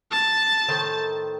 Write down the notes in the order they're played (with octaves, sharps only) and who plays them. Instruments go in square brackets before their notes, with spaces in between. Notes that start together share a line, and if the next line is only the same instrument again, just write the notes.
[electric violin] A5
[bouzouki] A2 D#3 C5